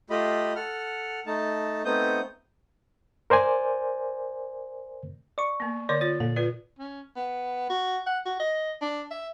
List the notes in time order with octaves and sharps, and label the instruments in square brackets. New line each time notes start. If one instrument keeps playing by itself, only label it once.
[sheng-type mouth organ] A3 F4 G4 D#5 B5
A4 F#5 F6
A3 D#4 A5
A3 B3 C4 D#4 D#6 G6
[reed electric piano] A#4 C5 D5 G#5
[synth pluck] D5 C#6
[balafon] A#3 B3
[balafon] D3 A#4 C#5 [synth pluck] D5
[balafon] F4 C#5 [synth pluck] A6
[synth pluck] A#2 [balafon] A4
[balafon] F4 B4 D5
[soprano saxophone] C#4
B3
F#4
F#5
F#4
D#5
D4
E5